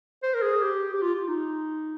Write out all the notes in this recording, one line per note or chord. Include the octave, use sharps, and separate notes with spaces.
C5
A#4
G#4
G4
G4
F4
F4
D#4